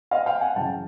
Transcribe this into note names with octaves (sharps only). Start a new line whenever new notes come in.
D#5 F5
F5 G5
F#5 G#5
F#2 C#3 E3 G5 A5